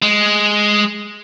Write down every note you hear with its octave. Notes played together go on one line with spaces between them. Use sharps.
G#3